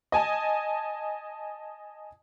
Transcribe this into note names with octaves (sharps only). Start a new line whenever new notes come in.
D#5 G#5 A5